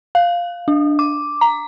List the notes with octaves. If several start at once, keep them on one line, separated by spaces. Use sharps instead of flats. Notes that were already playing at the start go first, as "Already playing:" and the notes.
F5
D4
D6
A#5